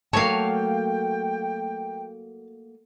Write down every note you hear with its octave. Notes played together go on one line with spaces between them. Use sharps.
F#3 A3 A#3 C#5 F5 G5 A5